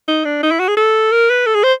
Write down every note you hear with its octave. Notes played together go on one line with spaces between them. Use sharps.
D#4
D4
D#4
E4
F#4
G#4
A4
A#4
B4
A4
G#4
C5